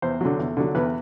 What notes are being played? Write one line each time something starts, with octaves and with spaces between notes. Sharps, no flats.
E2 C5
D3 F#3
E2
D3 F#3
E2 B4